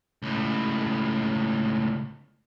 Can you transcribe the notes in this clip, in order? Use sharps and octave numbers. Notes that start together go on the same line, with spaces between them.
C#2 A2